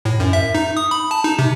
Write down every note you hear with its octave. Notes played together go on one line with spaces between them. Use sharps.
A2
F#2
E5
D#4
D#6
B5
A5
D#4
C3